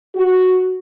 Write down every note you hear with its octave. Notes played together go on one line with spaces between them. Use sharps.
F#4